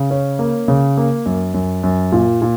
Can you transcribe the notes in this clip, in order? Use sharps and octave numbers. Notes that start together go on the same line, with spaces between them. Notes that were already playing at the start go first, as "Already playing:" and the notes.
Already playing: C#3
C#4
A#3
C#3
A#3
F#2
F#2
F#2
A#2
A#2